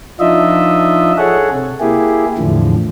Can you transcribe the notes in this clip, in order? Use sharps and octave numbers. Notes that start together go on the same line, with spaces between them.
F3 D4 D#4 F4 D#5 E5
G#4 A4 C#5 F#5
C3
A#3 E4 G4 G#4
E2 A2 D3 F3